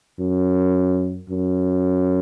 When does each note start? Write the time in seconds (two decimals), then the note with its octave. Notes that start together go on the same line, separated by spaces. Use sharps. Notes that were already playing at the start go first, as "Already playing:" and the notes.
0.20 F#2
1.30 F#2